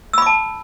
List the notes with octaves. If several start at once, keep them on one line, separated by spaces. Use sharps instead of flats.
A5 B5 D6 E6